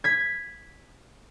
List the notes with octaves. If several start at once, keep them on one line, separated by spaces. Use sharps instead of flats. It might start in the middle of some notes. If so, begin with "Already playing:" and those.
G#6 B6